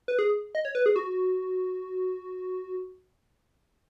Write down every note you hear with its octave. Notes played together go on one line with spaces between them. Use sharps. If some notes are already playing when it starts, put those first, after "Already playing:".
B4
G#4
D#5
C#5
B4
G#4
F#4